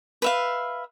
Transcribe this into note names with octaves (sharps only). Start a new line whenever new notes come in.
B4 E5 F5